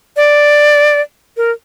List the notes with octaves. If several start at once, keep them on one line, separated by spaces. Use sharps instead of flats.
D5
A#4